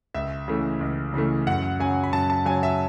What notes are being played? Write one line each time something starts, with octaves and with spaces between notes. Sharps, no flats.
C#2 E5
C#3 E3 A3
C#2
C#3 E3 A3
F#2 F#5
C#3 F#3 G#5
B5
F#2 A5
A5
C#3 F#3 G#5
E5